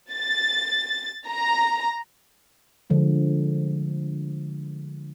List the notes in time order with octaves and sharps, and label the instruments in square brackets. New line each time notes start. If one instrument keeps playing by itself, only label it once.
[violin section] A6
A#5
[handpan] D3 F3 G#3